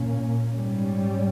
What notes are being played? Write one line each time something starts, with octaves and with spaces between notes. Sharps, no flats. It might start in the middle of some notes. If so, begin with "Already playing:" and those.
Already playing: A#2 A#3 C#4
G#2 G3 C#4